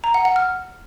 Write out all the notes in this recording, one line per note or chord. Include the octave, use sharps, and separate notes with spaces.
A#5
F#5
F#5
F6